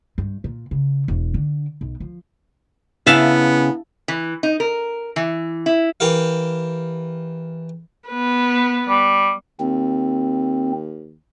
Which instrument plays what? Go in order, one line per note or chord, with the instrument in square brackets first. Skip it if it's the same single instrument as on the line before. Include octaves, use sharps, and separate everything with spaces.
[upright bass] G2
A#2
C#3
E1
D3
B1
F3
[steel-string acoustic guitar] C#3 [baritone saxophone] B3 [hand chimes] E4 [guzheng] E5 F5 A5
[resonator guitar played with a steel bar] E3
D#4
A#4
E3
E4
[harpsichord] E3 G4 A#4 F5
[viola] B3 B4
[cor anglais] G3
[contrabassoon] D#2 [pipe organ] C4